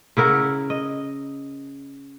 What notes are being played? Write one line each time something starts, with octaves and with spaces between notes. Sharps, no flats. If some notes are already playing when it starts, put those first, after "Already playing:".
C#3 E4 A#4 F#5
D#5